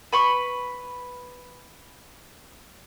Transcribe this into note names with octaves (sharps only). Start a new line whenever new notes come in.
B4 B5 C#6